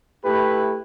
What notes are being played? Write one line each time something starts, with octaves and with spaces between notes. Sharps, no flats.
A3 E4 G4 B4